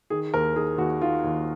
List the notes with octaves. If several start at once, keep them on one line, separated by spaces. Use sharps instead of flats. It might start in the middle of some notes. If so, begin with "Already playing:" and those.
D#3 G#4
D#2 A#4
D#3 G#4
D#2 F#4
D#3 F4
D#2